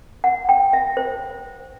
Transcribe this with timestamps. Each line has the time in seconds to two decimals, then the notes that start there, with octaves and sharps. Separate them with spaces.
0.24 F#5
0.49 G5
0.73 E5
0.97 C5